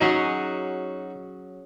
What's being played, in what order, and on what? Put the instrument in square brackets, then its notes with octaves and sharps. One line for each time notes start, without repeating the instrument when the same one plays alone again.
[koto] F#3 C#4 G#4 [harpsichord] D#4 F#4